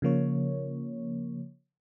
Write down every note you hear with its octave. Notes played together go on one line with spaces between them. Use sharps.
C#3 F3 A#3 C#5